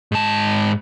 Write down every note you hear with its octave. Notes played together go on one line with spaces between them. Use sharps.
G#2 A5